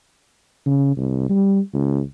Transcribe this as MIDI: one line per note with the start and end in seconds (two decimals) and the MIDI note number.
0.66 0.92 49
0.97 1.29 36
1.29 1.60 55
1.74 2.01 37